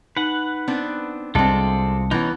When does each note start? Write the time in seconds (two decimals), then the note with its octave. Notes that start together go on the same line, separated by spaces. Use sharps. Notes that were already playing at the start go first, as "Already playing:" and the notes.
0.17 D#4 B4 F#5
0.68 B3 C4 D4
1.35 C2 G#3 C4 F4 A4 D5 A5
2.11 E3 B3 C#4 D#4